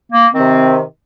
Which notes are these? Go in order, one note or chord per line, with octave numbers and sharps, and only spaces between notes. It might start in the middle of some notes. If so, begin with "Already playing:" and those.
A#3
C3 D#3 C4